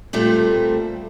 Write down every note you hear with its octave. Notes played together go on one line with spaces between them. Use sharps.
A#2 G3 A3 C4